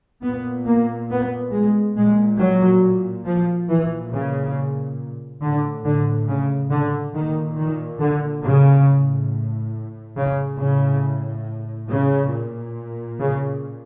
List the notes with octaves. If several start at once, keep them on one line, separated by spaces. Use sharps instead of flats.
A#2 B3
A#3
B3
G#3
A#2 G#3
F#3
F3
A#2 E3
C#3
A2 D3
D3
C#3
D3
A#2 D#3
D#3
D3
C#3
A2
C#3
A2 C#3
C#3
A#2
C#3